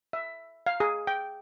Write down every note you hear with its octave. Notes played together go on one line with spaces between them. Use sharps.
E5
F5
G#4
G5